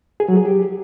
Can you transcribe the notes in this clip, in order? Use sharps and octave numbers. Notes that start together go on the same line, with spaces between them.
G#4
F#3
G#4
G4